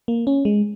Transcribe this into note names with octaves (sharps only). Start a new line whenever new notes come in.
A#3
C#4
G#3